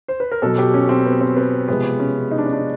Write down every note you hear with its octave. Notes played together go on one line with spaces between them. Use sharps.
C5
B4
A#4
B2 F#3 A4
G4
C#4
C4
B3
C4
B3
C3 F3 G#3 B3
C#4
D#4
D4
C#4
D4